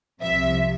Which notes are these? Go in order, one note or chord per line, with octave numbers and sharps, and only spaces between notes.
C2 C3 F3 E5